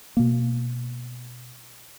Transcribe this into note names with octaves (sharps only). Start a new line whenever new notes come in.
B2 A#3